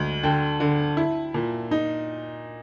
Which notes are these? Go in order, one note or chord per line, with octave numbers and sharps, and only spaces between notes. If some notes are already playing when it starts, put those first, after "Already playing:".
Already playing: D2 G#3
D3 G5 A5
D3
E4
A#2
D#4